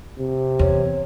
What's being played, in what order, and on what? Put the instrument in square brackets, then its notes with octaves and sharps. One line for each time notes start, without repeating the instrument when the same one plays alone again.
[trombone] C3
[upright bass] E2 [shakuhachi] C#5